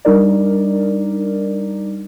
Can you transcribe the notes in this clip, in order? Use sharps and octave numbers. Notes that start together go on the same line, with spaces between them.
G3 D4 D#4 A#4 D5